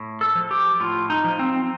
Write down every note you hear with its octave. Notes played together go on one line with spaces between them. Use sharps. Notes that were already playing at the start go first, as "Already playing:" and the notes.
Already playing: A2
A4
F3
G4
A2 F4
D#4
F3
C4